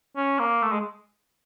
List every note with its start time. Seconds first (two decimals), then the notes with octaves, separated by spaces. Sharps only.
0.17 C#4
0.39 A#3
0.62 A3
0.72 G#3